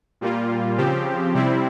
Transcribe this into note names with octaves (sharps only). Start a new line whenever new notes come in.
A#2 G3 A#3 F4
C#3 F3 C4 G4
C3 G3 C4 E4